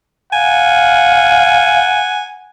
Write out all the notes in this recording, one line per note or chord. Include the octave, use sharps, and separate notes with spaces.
F5 F#5 G#5